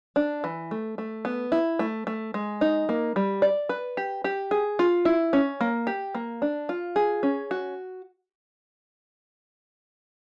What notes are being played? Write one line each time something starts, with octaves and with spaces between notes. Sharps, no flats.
D4
E3
A3
A3
B3
E4
A3
A3
G#3
D#4
A#3
G3
D5
B4
G4
G4
G#4
F4
E4
C#4
A#3
G4
A#3
D4
F4
G#4
C#4
F#4